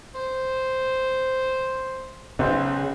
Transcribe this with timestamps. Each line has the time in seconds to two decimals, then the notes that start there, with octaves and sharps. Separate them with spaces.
0.14 C5
2.39 B1 C#3 F#4 C5